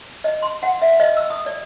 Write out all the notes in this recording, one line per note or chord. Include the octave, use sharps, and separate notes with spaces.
D#5
C6
F#5
E5
D#5
E6
D#6
D5